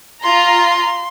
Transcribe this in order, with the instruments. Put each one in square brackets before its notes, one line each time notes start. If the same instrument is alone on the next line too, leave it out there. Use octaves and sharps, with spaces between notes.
[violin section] F4 A#5 [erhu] C6